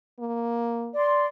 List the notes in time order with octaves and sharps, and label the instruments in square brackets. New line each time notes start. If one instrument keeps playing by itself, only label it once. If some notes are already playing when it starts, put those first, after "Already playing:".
[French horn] A#3
[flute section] D5 C6